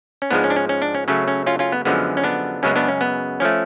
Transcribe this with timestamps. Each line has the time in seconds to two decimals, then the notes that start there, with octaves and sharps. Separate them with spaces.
0.22 C#4
0.31 G#2 F3 G#3 B3 D4
0.44 C#4
0.50 D4
0.56 C#4
0.69 C#4
0.82 D4
0.95 C#4
1.08 C#3 F#3 A3 C#4
1.28 C#4
1.46 C#4 F4
1.59 C#4 F4
1.72 B3
1.85 F#2 D3 F3 G#3 B3
2.17 C#4
2.24 B3 D4
2.63 F#2 C#3 G#3 B3 C#4
2.76 B3 D4
2.88 C#4
3.01 B3
3.40 F3 A3 C#4